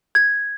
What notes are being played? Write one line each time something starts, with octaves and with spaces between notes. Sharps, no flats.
G#6